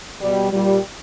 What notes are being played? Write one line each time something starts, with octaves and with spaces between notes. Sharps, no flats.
B2 G3
A#2 G3